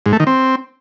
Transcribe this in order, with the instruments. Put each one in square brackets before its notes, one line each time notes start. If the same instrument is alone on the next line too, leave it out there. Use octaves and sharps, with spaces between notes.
[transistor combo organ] G#2
A3
D#3
C4